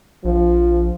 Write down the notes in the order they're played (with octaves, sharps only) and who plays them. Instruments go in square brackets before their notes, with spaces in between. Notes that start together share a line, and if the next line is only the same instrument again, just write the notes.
[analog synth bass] A#1 [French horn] F3